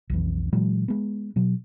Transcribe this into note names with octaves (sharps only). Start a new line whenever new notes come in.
B1 F2 E3
A#2 E3 F#3 G#3
G#3 B3
B2 F#3